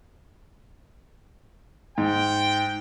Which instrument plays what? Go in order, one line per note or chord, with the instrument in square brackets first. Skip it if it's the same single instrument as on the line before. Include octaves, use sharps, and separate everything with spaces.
[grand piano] G#2 [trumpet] G5